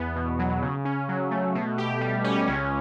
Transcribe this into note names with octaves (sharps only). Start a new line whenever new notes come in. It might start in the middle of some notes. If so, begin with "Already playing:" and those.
Already playing: E2 B3
B2
F#3
C#3
C#4
F#3
A3
B2
G4
G3
C#4
C#2